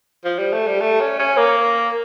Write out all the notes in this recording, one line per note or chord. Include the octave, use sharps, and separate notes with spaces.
F3
G3
A3
G3
A3
C#4
C#4
A#3